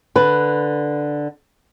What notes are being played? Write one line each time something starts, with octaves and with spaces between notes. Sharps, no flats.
D3 B4